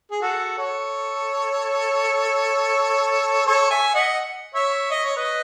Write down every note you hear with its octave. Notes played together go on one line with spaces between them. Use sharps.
G#4
F#4 A4
A4 C#5
A4 C#5
E5 G#5
D#5 F#5
C#5 E5
D#5
C#5
B4 D#5